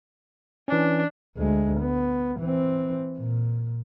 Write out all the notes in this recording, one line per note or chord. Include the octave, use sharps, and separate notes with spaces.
E3 C#4 D4
D2 G#3
B3
E3 C4
A#2